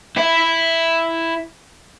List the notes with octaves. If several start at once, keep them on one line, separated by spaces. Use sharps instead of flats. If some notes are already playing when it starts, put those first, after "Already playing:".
E4 E5